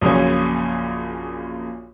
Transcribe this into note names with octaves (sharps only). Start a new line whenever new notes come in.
A#1 F#2 A#2 C#3 C#5